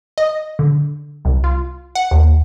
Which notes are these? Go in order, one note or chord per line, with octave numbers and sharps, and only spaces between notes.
D#5
D3
C2
F4
F#5
D#2